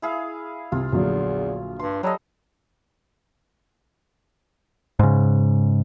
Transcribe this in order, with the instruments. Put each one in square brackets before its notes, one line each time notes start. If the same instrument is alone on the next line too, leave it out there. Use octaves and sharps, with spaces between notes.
[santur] E4 G#4 F5
[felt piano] C2 [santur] F4
[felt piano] A#1 D3 F#3 [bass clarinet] E2
[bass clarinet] G2 [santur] C6
[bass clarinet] F#3 [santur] G3 A4 D#5
[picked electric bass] G#2 C#3